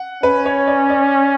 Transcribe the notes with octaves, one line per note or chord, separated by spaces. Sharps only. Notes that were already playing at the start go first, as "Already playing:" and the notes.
Already playing: F#5
C#4 B4
C#5
D5
D5